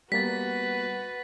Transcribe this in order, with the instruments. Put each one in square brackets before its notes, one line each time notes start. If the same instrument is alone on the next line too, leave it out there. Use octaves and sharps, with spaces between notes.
[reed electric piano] G3 A#3 B3 [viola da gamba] F#4 B4 [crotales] A6 B6